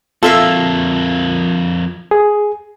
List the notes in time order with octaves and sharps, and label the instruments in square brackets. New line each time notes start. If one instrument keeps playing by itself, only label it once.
[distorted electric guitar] F2 A#3 [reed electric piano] F4 [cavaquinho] A4 E5 F5
[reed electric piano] G#4